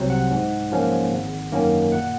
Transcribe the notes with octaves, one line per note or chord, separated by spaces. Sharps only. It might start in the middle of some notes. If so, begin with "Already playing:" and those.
Already playing: C2 C3 F#3 C4 C5 C#5
F#5
G#2
F3 A#3 C#4
G#1
F#2 D#3 A#3 C#4
A#2 F#5